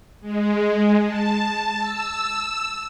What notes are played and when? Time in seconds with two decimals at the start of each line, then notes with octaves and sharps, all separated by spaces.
0.21 G#3
1.04 A5
1.80 E6